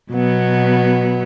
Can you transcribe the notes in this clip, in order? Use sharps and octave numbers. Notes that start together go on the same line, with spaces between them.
B2 F#3 B3